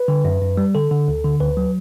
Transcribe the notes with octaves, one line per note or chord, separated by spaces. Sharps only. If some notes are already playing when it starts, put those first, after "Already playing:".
Already playing: B4
D3
F#2
F#2
G3
D3 A4
D3
D2
D3
D2 B4
F#3